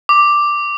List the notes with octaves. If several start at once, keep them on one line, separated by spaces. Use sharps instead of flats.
D6